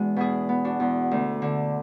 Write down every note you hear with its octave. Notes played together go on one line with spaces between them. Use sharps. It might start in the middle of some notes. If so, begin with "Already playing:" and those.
Already playing: E2 G#3 D4 F#4
B2 E4 G#4
B3
D4 F#4
E2
D2
D3